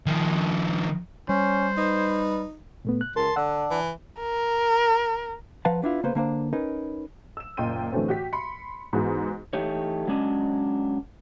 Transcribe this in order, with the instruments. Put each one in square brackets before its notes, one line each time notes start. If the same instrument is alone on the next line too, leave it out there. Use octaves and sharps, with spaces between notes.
[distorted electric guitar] D#3 F3
[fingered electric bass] G3 [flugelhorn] C#4 [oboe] C5
[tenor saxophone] D#4 [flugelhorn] B4
[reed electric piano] A#2 A3 B3
F#6
[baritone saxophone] C#2 [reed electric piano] A#4 [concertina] A5 C6
[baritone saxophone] D3 [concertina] D4 [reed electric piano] F#5 E6
[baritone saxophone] E3
[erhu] A#4
[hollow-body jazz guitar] F3 B4 F5 F#5 A5 A#5
B3 D4 E4 F4
C#3 A#3 B3 B4 C5
D3 A#3 D4 C5
C#4 D#4 A#4 B4
[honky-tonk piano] E6 E7
F#1 A#2 D#5 G5 C6 D#7
A2 D3 E3 F#3 A3 C4
F#4 G4 B6
B5 C6 C#7
G#2 E3 B3 F#4 G#4
[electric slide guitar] E3 A3 D#4 G4 C#5
F#3 G#3 C#4 D4 D5 D#5